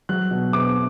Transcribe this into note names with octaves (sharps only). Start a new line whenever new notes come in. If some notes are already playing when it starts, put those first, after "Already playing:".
F#3 F#6
B2
B2 D6